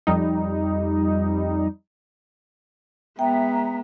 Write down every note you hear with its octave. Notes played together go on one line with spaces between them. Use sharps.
F2 G3 D#4
G#3 B3 E5 G5 A#5